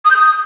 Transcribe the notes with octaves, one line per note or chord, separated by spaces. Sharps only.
D#6
G6
D#6